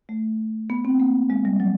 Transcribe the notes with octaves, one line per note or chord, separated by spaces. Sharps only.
A3
B3
C4
A#3
G#3
G3
F#3